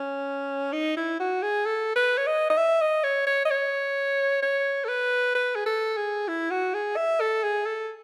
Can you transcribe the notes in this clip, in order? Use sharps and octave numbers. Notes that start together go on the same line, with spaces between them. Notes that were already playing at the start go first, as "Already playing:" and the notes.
Already playing: C#4
D#4
E4
F#4
G#4
A4
B4
C#5
D#5
D#5
E5
D#5
C#5
C#5
D#5
C#5
C#5
A4
B4
B4
G#4
A4
G#4
E4
F#4
G#4
E5
A4
G#4
A4